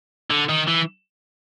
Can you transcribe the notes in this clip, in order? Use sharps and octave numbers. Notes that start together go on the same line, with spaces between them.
D3
D#3
E3